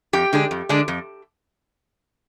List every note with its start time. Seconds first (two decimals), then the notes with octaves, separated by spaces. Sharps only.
0.13 F2 G4 G5
0.33 D3 G#3 D4
0.51 F2
0.69 D3 G#3 D4
0.88 F2